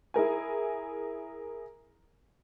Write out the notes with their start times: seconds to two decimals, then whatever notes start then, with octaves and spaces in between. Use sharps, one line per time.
0.14 E4 G#4 A#4 G#5